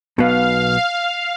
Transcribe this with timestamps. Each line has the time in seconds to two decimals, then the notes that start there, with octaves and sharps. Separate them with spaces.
0.18 B1 B2 B3 F5